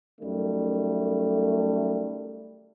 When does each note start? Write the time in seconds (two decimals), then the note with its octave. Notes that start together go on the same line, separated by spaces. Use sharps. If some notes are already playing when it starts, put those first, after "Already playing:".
0.21 F#2 D#3 G3 A3